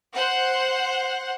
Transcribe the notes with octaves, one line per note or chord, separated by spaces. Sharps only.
C5 F#5